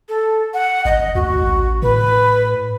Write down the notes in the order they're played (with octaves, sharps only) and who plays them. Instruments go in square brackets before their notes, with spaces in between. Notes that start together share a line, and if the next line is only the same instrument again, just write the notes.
[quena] A4
F#5
[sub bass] G#1 [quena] D#5
[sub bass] D2 [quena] F#4
[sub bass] A1
[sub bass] A2 [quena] B4